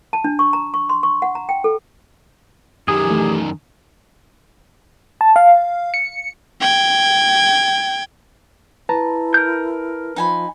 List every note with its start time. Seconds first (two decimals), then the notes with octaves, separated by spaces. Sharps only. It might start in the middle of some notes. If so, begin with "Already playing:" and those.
0.13 A5
0.24 D4
0.39 C#6
0.53 A#5
0.74 C#6
0.89 C6
1.03 C#6
1.22 F#5
1.35 A#5
1.49 G5
1.64 A4
2.88 F#2 D#3 G4 G#4
3.07 E3 A3
5.21 A5
5.36 F5
5.94 C#7
6.61 G5 G#6
8.89 E4 B4 A5 A#5
9.34 A#4 G6
10.16 F3 D#4 G#5 B5